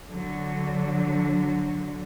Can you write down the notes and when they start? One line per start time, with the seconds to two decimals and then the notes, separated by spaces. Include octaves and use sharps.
0.09 D3 F#3